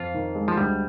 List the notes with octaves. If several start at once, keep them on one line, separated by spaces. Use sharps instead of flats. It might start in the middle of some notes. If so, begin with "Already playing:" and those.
Already playing: F2 F4
D#3
G#3
F3
D2 G3